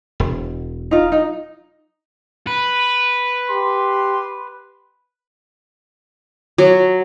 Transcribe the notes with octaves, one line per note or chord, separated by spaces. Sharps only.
E1
D#4 F4
D#4
B4
G4 C6
F#3